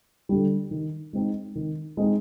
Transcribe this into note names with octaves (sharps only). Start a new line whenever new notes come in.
D3 G3
D#3
G#3 C4 D#4
D#3
G#3 C4 D#4